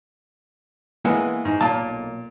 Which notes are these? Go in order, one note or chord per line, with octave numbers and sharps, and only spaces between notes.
E3 G#3 A#3 B3 E4 F#5
G#2
B1 A#2 A#3 A5